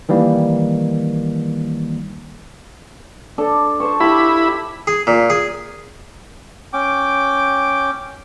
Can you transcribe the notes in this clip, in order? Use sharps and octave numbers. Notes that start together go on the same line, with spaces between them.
D#3 E3 G3 A#3
D4 A4
C5 A5 C#6
E4 G4 F5 B5
G#4
A#2
G#4
C#4 G5 D6